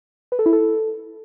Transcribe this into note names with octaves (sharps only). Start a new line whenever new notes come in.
B4
A4
E4
A4